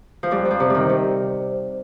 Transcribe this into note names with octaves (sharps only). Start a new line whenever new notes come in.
F3
F2 G3
F2
F3
C3
D#3 G3
C3